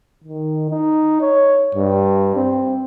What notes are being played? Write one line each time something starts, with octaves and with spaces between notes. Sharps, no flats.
D#3
D#4
C#5
G2
C4